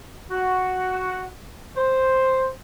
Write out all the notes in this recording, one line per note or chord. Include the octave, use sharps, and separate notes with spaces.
F#4
C5